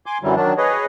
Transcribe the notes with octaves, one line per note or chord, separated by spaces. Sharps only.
G#5 C6 D6
F#2 D3 E3 F#3 G3
D#3 F#3 D4
G#4 B4 C#5 D#5